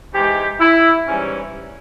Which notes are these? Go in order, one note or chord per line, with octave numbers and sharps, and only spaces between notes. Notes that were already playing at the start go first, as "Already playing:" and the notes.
G#2 E3 G#3 G4
E4
G#2 E3 G3 C#4